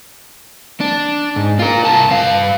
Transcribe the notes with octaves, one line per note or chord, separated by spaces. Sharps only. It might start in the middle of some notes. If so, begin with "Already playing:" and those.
D4
G#2
F4 A#4
C2 A5
G2 F5